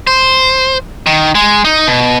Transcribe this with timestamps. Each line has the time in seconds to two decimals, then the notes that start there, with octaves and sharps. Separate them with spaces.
0.07 C5
1.06 D#3
1.35 G#3
1.65 D#4
1.87 B2